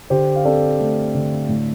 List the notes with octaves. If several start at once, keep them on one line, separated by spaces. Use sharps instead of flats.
D3 G4 C5
F5
C4 A4 D5
A3
D3
A2